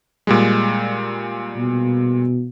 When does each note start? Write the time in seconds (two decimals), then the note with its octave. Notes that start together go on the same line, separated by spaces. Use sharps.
0.27 A#2 G3 G#3
1.56 B2